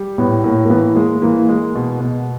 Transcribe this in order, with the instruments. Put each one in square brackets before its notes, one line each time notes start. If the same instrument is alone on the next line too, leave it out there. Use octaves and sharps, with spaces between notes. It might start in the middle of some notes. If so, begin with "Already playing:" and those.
Already playing: [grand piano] G3
[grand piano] A2 [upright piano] B3
[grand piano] A2 [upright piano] A#3
[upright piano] A#3
[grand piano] E3 [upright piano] B3
[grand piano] G#3 [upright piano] A#3
[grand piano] E3 [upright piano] A#3
[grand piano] G#3
B2
B2